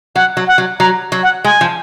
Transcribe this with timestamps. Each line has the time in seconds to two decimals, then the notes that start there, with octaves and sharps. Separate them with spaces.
0.15 F#3 F#5
0.37 F#3
0.47 F#5
0.58 F#3
0.79 F#3 A#5
1.12 F#3
1.23 F#5
1.44 G#3 G#5
1.61 F3